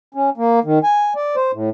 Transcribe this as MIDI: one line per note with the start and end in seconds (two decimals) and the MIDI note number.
0.14 0.30 61
0.37 0.60 58
0.64 0.79 51
0.84 1.13 80
1.16 1.36 74
1.36 1.51 72
1.53 1.70 45